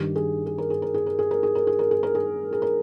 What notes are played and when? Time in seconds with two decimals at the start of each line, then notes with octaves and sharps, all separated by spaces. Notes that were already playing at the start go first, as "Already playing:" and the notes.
Already playing: G2 D#3 G4
0.16 G#4
0.46 G#4
0.58 A#4
0.70 G#4
0.82 A#4
0.94 G#4
1.06 A#4
1.19 G#4
1.31 A#4
1.43 G#4
1.55 A#4
1.67 G#4
1.79 A#4
1.91 G#4
2.03 A#4
2.15 G#4
2.53 G#4
2.62 A#4